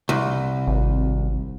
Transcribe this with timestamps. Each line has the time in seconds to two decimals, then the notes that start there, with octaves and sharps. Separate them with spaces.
0.09 C2
0.67 G#1